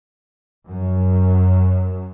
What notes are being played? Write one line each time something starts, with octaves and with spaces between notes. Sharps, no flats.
F#2